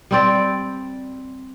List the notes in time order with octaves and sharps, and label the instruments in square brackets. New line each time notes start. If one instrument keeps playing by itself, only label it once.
[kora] G3 C4 D5